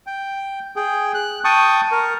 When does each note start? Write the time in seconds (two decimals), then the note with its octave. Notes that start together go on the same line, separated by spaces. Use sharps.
0.07 G5
0.76 G#4 G5
1.14 F#6
1.44 G5 A5 C#6 D#6
1.92 A#4